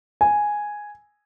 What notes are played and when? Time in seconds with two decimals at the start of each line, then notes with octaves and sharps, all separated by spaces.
0.21 G#5